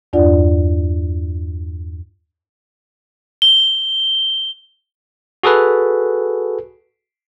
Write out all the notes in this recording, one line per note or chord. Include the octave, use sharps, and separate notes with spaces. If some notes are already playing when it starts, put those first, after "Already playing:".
E2 G2 D4 F4 D5 F#5
G7
F#4 G#4 A4 B4